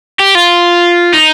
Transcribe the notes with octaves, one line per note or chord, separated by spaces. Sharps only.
G4
F4
D#4